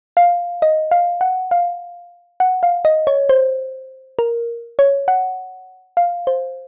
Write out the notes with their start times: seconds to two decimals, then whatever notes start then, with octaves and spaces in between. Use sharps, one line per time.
0.17 F5
0.62 D#5
0.91 F5
1.21 F#5
1.51 F5
2.40 F#5
2.63 F5
2.85 D#5
3.07 C#5
3.29 C5
4.19 A#4
4.79 C#5
5.08 F#5
5.97 F5
6.27 C5